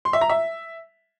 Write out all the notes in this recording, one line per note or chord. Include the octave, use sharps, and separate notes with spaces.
C6
E5
A#5
E5